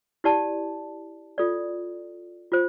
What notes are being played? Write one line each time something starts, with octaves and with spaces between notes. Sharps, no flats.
E4 G4 D5 A5
F4 A4 D5
F4 C5